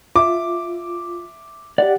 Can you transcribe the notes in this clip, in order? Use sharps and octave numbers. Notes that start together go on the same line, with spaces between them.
F4 E5 D6
G4 D5 F#5